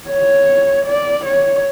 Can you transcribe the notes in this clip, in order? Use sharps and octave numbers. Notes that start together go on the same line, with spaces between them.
C#5
D5
C#5